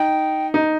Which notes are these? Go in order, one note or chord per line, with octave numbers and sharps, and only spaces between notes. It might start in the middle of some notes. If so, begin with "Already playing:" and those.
Already playing: D#4 G5
D#4